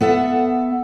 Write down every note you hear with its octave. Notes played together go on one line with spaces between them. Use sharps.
B3 A4 E5 F#5